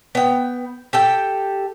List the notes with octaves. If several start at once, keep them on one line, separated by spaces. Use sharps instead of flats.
B3 G5
G4 A4 G5